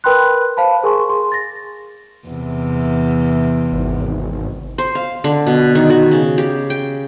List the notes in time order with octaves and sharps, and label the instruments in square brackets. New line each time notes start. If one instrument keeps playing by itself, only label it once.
[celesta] A#4 B4 G5 B5 C6 F#6
C5 F5 A5 B5
G#4 A#4 G#5 C6 C#6
G#4 C6
A6 A#6
[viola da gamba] E2 C3
[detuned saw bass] G#1
[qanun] C5
F5
D3
B2
D#3
F#4
C#3
G4
G5